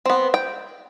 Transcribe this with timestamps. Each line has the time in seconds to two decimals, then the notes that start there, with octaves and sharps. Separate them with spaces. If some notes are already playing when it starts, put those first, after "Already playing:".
0.06 B3 C4
0.34 G5